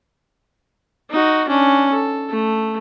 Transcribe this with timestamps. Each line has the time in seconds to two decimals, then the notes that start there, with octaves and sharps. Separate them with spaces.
1.10 D#4 F#4
1.48 C#4 D4
1.93 A4
2.31 A3